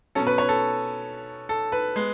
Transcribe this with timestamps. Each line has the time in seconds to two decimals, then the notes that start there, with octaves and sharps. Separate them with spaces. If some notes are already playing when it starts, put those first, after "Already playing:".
0.15 B2 F#3 C#4 A4
0.27 B4
0.38 C#5
0.49 A4
1.49 A4
1.72 B4
1.96 G#3 B3